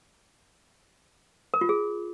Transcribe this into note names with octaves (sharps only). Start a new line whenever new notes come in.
A#4
F4
G#4